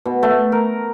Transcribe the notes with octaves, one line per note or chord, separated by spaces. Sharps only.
B2
A3
A#4